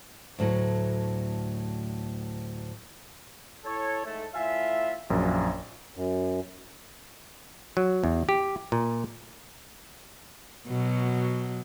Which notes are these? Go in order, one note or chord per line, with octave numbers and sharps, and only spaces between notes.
D2 A2 F#3
E4 A4 C#5
G#2 A3 A4
A2 F4 E5 G#5
A#1 F#2 C#3
F#2
F#3
E2
G4
A#2
B2 F#3